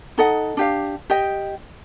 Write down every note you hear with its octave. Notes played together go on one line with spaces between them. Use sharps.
D#4 A4 D#5 F#5
D4 G4 F5
G4 D#5 G5